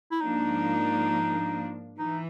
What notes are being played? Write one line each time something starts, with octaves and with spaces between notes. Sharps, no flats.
E4
G#2 F3 A#3 D4 D#4
E3 D#4